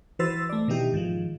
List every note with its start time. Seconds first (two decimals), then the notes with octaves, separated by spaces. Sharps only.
0.19 E3 F#4 B4 C5 E6 A6
0.49 A3 D5
0.68 B2 D#3 E3 D#4 G4
0.93 G#2 D#3 F3